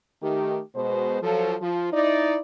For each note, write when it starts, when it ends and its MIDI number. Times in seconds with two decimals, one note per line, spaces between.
0.22 0.60 51
0.22 0.60 57
0.22 0.60 67
0.76 1.19 47
0.76 1.19 56
0.76 1.19 72
1.23 1.56 53
1.23 1.56 54
1.23 1.56 69
1.61 1.93 53
1.61 1.93 65
1.93 2.39 63
1.93 2.39 64
1.93 2.39 74